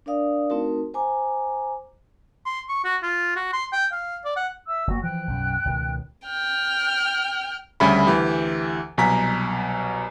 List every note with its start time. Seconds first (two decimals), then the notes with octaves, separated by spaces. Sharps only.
0.06 D4 A#4 D5 F5 D#6
0.50 A3 C4 D#4 F#4 A#4
0.94 C5 G#5 A#5 D6
2.46 C6
2.69 C#6
2.84 F#4
3.03 F4
3.36 F#4
3.53 C6
3.73 G5
3.92 F5
4.25 D5
4.36 F#5
4.67 E5 E6
4.87 F#1 A#3 F#4
5.04 E3 F3 G5 F#6
5.27 B1 F#2
5.65 C#2 B2 D#3
6.27 G5 F6
7.80 D2 C#3 G3 E5 B5
8.07 D2 E3 G4
8.98 C2 B2 F#3 G#5 A#5 B6